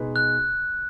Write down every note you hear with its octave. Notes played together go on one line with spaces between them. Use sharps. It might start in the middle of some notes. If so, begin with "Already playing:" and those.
Already playing: B2 G#3 D#4 G#4 B4
F#6